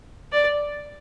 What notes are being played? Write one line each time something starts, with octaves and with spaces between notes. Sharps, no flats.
D5